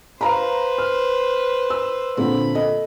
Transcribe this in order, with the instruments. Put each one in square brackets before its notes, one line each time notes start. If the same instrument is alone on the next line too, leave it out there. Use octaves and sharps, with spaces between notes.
[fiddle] B4 C5 [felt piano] F5 A#5 B5
[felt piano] F6
E6
[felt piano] A#2 D3 C4 [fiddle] B5
[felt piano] A4 D#5